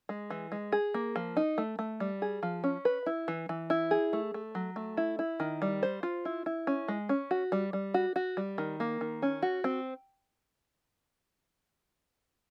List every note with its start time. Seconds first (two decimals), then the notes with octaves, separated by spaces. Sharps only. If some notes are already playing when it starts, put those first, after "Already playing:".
0.09 G#3
0.30 E3
0.52 G#3
0.72 G#4
0.94 A#3
1.16 F3
1.37 D#4
1.58 A3
1.79 A3
2.00 G3
2.22 G#4
2.43 F3
2.64 C#4
2.85 B4
3.06 E4
3.28 E3
3.49 E3
3.70 E4
3.91 G#4
4.13 A3
4.34 A3
4.55 F#3
4.76 A3
4.97 E4
5.19 E4
5.40 D#3
5.62 G3
5.83 C5
6.03 F4
6.25 E4
6.46 E4
6.67 C#4
6.88 G#3
7.09 C#4
7.31 F#4
7.52 G3
7.73 G3
7.94 F#4
8.16 F#4
8.37 G3
8.58 D#3
8.80 A#3
9.01 D#3
9.22 C#4
9.42 F#4
9.64 C4